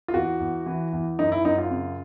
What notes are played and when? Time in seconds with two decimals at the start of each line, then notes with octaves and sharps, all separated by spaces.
0.08 F4
0.14 E2 F#4
0.40 E2
0.66 E3
0.93 E2
1.19 F#2 D#4
1.32 E4
1.45 F#2 D#4
1.58 F4
1.71 C#3